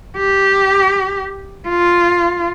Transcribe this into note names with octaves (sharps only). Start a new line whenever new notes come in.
G4
F4